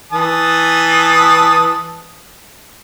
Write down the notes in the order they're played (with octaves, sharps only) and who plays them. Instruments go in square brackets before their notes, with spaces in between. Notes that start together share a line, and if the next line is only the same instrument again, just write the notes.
[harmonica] E3 A5 D#6